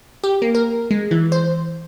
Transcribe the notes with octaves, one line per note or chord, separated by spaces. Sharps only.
G4
A#3
A#4
G#3
E3
C5